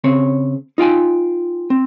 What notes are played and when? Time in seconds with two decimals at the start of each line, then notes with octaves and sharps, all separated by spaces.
0.04 C#3 C4 C#5
0.78 D#4 F4 G5 G#5
1.70 C4